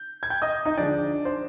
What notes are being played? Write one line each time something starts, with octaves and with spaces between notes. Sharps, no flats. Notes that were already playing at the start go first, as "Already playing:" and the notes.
Already playing: G6
G#6
G5 G6
D#5 D#6
D#4 D#5
D3 F3 G#3 D4 D5
C5